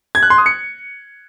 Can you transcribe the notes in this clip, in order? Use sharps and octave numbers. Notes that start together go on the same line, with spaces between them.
G#6
F#6
C6
D#6
C#7